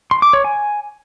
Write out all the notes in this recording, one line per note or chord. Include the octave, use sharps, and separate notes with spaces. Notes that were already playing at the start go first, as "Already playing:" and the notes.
C6
D6
C#5
G#5